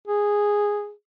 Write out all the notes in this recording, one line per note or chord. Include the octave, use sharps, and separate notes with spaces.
G#4